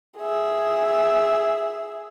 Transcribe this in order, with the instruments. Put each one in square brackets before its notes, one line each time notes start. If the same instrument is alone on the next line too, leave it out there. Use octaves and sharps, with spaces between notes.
[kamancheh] G#4 E5